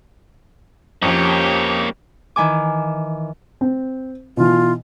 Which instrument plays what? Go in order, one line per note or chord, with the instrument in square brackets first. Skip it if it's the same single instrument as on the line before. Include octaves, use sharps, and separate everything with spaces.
[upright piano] F2 [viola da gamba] F3 C#4 G4 [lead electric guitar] A#3 C#5
[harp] D#3 E3 G#5 D6
[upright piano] C4
[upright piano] B2 E3 [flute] F4